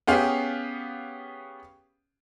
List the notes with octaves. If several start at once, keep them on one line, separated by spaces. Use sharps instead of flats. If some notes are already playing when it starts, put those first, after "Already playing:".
B3 C#4 G4 G#4 F5